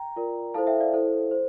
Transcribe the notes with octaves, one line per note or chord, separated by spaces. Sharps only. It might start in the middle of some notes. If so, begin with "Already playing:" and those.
Already playing: G5 A#5
F4 A#4 D5
E4 A4 C5 F5 A5
E5 G5
D5 F5
E4 A4 C5
C5